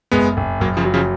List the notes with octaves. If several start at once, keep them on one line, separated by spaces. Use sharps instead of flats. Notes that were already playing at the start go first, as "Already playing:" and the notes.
F#1 G#3 B3
F#1
F#1 F#3 A#3
C#3 F3
F#3
C#3 F3